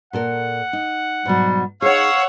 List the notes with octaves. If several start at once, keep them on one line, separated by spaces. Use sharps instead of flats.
A#2 A4 A#4 F#5
D#4
G#2 B2 F#3 G3
D#4 G#4 C#5 F5 F#5 E6